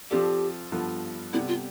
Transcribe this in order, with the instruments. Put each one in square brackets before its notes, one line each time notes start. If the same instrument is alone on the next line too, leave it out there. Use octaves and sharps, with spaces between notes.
[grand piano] F3 C4 F4 A4 D5 [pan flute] G4
[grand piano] G2 F3 B3 F4 A4
[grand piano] C3 G3 B3 D4 A4 [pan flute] E4
[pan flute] F4